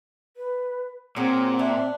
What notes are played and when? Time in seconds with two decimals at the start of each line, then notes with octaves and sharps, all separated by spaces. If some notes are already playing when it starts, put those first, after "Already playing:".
0.37 B4
1.16 A#2 F#3 C4 G#4 F#5
1.59 D4 E5